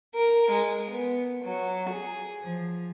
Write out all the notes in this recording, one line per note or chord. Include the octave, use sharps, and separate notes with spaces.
A#4
G#3
B3
F#3
G#4
F3